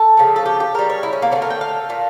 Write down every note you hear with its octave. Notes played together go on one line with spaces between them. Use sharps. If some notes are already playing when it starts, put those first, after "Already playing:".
Already playing: A4
C#3 F3 A3
A4
G4
G4
C#3 G3 A#4
C#5
E4
C#4
A#3
D3 A3 C#4
A#4
G5
F5
A#2 A3